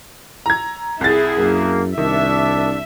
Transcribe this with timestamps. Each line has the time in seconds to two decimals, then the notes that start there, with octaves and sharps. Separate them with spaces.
0.46 A#5 G#6
1.01 C2 E4 G#4 A6
1.38 F#2 A#3
1.98 C2 D#3 D4 E5